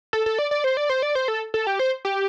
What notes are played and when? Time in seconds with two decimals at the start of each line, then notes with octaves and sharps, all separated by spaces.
0.13 A4
0.26 A4
0.39 D5
0.51 D5
0.64 C5
0.77 D5
0.89 C5
1.02 D5
1.15 C5
1.28 A4
1.54 A4
1.67 G4
1.79 C5
2.05 G4